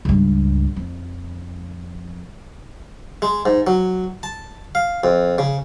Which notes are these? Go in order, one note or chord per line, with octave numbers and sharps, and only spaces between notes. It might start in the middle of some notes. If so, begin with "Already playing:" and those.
C#2 G2
F2
G#3
G#2
F#3
A5
F5
F2
C#3